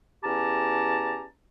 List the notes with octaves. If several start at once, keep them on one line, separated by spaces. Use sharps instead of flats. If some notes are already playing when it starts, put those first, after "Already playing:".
E2 C#4 G4 A5 A#5